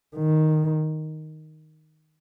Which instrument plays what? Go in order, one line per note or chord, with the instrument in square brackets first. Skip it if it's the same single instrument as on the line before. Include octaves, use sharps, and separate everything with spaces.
[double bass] D#3